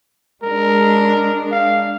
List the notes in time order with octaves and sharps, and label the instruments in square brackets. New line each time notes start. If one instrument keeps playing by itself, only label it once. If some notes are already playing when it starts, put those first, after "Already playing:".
[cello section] G#3 D4 [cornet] A#4
[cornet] F5